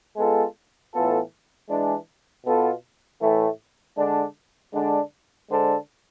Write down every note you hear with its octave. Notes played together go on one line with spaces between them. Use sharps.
G#3 B3 F4 A4
A2 E3 B3 F4 A4
E3 G#3 D4
B2 B3 F4 A4
A2 E3 A3
D3 G#3 D4
D3 G#3 D4
D3 G#3 D4 A4 C5